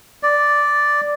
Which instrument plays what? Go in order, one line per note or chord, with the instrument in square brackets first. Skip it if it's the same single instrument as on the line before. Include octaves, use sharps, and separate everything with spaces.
[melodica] D5